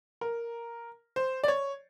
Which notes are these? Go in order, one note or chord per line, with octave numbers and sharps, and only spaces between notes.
A#4
C5
D5
C#5